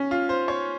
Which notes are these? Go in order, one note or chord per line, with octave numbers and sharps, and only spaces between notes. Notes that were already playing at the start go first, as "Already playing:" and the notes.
Already playing: C#4
F4
C5
C#5